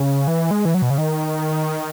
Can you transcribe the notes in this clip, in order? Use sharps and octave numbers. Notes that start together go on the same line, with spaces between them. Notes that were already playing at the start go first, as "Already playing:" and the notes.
Already playing: C#3
E3
G#3
E3
F#3
B2
C#3
D#3